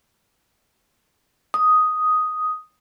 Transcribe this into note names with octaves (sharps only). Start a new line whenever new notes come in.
D#6